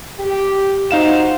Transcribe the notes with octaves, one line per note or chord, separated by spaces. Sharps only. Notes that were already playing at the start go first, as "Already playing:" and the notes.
G4
D#4 F4 F#4 C5 F5 E7